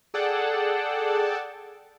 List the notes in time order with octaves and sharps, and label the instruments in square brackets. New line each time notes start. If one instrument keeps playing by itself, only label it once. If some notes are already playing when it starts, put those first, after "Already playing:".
[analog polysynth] G#4 A4 D5 F#5 G5 A5